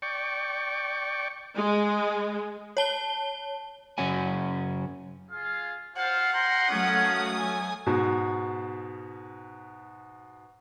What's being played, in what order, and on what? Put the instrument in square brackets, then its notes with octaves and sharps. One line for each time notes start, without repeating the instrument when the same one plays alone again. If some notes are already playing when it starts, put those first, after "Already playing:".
[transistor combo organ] D5 G5 C#6
[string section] G#3
[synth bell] C#5 A5 G7
[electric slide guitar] F#2 C#3 C#4 F#4 G#5
[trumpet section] F4 G#4 F5
[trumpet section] F4 C5 F5 [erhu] F#5
[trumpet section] G5 A#5 C6
[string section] F#3 A3 D#6 [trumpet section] A#3 C#4
[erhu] G#5
[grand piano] G#2 B2